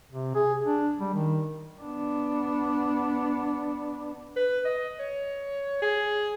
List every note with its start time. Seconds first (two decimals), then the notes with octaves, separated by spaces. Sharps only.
0.12 C3
0.35 G#4
0.66 D4
1.00 G3
1.14 D#3
1.82 B3 D4
4.36 B4
4.65 D#5
5.00 C#5
5.82 G#4